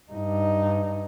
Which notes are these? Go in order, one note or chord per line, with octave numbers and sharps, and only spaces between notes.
G2 D#4